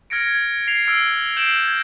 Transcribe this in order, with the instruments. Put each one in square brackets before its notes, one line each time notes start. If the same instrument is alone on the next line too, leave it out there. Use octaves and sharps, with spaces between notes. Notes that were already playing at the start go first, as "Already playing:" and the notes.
[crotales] F6 G#6 A#6 C#7 D7
G#6
G#6 C7 F7
E6 F6 G#6 C7 D7
G6 C7 D7 E7 F#7
G#6 A#6